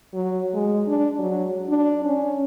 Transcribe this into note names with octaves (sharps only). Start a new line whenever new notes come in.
F#3
G#3
D4
F#3
D4
C#4